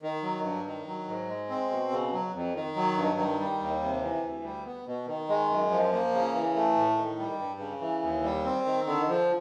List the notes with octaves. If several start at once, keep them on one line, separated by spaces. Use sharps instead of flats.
D#3
F#3
G2
D#3
F#3
G#2
G#3
C4
B2
C#3
F#3
F2
D#3
F#3
G2
D#3
G3
D#2
C3
E3
D2
G3
B3
B2
D#3
G#3
F#2
F3
A#3
C#3
E3
A3
A2
D#3
G3
G2
C#3
E3
D#2
G3
C4
D#3
D3
F3